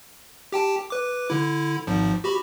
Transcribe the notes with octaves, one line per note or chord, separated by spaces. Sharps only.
G4 G5 A5
B4 D6
D3 E4
G#1 G#2 F3
F#4 G4 B5